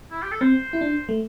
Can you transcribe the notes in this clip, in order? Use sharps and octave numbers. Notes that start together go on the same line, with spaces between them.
E4
G4
A4
C4 C5
E4
D4
A3